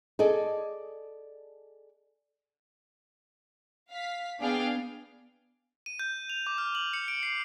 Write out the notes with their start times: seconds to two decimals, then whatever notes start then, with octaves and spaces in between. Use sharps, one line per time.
0.19 G#4 A4 D5 D#5
3.91 F5 B6
4.40 B3 D4 G#4 F5 G5
5.86 D#7
5.99 G6
6.30 F7
6.47 D6
6.58 F6
6.75 F#7
6.93 C#7
7.08 D7
7.23 C7